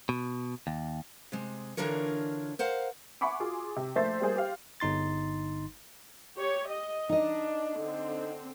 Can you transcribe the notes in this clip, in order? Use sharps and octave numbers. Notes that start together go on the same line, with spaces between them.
B2
D#2
C3 G#3
D3 E3 D4 F4 A#4 C#5
A#4 C5 F5 F#5
E5 F#5 G#5 B5 C#6 D6
F4 F#4 G#4 C6
C3
A#1 A3 C5 E5 C6 A6
G3 A#3 G#4 C5
G4 C5 F5 F6
G1 D#4 C6 A6
G4 C#5
D#5
D4 D#4 D#5
D3 C4